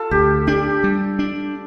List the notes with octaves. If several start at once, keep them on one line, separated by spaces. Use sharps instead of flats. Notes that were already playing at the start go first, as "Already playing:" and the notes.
Already playing: F4 A4
D2 G4
D4 G4
G3
D4